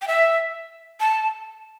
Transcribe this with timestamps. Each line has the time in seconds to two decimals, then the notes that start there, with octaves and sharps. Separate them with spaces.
0.02 G5
0.08 E5
1.00 A5